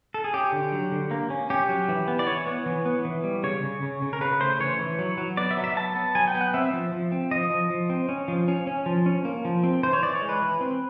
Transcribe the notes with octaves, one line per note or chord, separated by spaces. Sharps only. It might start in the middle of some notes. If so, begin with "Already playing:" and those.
A4
G#4
C#4 G4
D3
F#3
D3
A#3
C#4
C#4 G4
F#3
E3
B3
D5
E3 C#5
B3
E3
B3
E3
G3
C#3 C#5
C#3
C#3
C#3
A#4
C#3 B4
A3 C5
E3 C#5
E3
F#3
F#3
B3 D5
E5
F#3
E5
B3 A5
B3
F#3 G#5
G5
B3
F#5
C4 E5
F3
F3
C4
F3 D#5
F3
F3
C4
C#4
F3
C#4
C#4
F3
C#4
A#3
F3
C4
E3 C5
C#5
E3 D5
C#5
G#3
B4
E3
C4